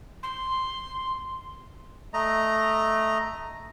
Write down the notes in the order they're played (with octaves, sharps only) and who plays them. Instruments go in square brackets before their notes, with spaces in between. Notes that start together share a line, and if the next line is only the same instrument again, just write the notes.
[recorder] C6
[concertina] A3 D#5 A#5